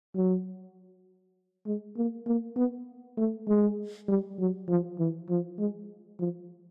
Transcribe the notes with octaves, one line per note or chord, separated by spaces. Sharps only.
F#3
G#3
A#3
A#3
B3
A3
G#3
G3
F#3
F3
E3
F3
G#3
F3